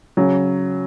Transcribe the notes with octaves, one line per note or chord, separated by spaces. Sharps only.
C#3 F#3